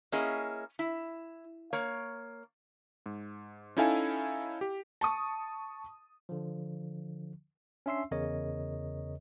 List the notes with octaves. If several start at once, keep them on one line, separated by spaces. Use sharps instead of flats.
A#3 C#4 E4 G#4 D#5
E4
A#3 C#5
G#2
C#4 D#4 E4 A4 F5 G#5
G4
A5 C#6 D#6
D3 F3
C#4 D4 E5 C6 E6 C7
E2 C#3 A#4 C#5 D#5